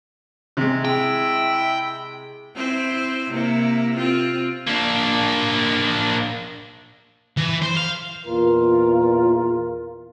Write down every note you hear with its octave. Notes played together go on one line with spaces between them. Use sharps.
C3 G#3
E4 G5
C4 E4 C5
C3 A#3 E4
C4 F4
A#3 D4
E3
C5
F5
E2 A#2 F4 A#4